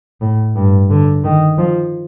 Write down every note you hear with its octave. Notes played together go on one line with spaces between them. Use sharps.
A2
G2
D3
D#3
F3